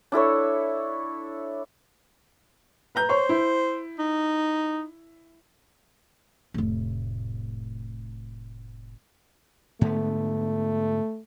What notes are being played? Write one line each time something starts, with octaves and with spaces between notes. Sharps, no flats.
D4 E4 A4 C#5
B4 A#5 G6
C5 C#5 C#6
E4
D#4
F1 A2
G#2 D3 A3 B3